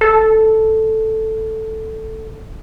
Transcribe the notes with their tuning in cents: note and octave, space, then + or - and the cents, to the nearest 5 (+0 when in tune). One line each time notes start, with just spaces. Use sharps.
A4 +0